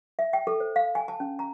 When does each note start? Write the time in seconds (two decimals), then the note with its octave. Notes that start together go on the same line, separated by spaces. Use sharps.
0.19 E5
0.33 G5
0.47 A4
0.60 C5
0.76 F5
0.95 G#5
1.08 A5
1.20 C#4
1.39 A#5